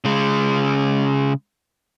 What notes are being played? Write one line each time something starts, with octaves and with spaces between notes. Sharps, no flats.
C#3 G#3